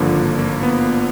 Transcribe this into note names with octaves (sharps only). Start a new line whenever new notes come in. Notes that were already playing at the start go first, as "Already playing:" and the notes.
Already playing: G#1 G2 D3 F3 A#3
A#3
B3